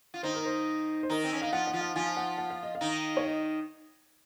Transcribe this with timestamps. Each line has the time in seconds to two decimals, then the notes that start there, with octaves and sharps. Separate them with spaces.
0.14 F4
0.23 D#3 D#4 C5
0.34 A#4
0.45 C5
1.03 C5
1.09 D#3 D#4 A#4
1.24 C4
1.33 C#4
1.42 D#4 F5
1.52 F3 F4 F#5
1.67 F#5
1.73 F3 F4
1.81 F#5
1.96 F3 F4 G#5
2.17 F#5
2.38 F#5
2.50 F5
2.63 D#5
2.75 F5
2.81 D#3 D#4
3.17 C#5
3.25 D#5